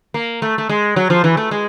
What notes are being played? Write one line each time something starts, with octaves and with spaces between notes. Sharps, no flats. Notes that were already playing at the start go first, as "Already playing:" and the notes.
A#3
A3
A3
G#3
F#3
F3
E3
A3
G#3